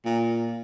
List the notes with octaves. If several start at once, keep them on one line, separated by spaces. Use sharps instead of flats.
A#2